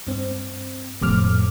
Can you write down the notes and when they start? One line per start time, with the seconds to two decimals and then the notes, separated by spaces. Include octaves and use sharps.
0.07 G2 C4
1.02 F2 A2 F3 D6 F6